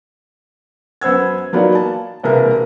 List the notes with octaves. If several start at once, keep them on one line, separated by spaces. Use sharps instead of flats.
F#2 B3 C5 E6 G#6
F#3 A#3 B3 D#4 F4 D5
A5
E1 C2 A#3 A#4 B4 F5